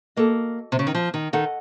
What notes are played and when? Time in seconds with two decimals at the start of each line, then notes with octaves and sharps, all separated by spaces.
0.16 A#3 F#4 A4 D#5
0.72 C3
0.79 C#3
0.87 D#3
0.94 F3
1.14 D#3
1.33 D#3 A4 D#5 F#5